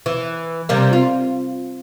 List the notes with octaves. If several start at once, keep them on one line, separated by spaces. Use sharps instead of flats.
E3
C3 G3 A#3
F4